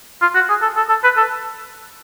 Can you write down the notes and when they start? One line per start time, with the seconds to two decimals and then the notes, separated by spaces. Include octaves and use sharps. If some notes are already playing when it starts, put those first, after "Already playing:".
0.22 F4
0.35 F#4
0.49 G#4
0.62 A4
0.76 A4
0.89 A4
1.04 B4
1.17 A4